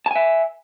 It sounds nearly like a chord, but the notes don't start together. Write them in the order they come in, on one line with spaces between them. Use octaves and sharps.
A5 G#5 E5